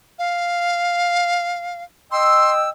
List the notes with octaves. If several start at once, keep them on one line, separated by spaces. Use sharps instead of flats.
F5
D#5 G5 C6 E6